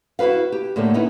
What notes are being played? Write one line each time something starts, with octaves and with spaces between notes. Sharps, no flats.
E4 F#4 G#4 B4 F5
G4
A2 D3 A3 A#3
B3 C#4 D#4 E4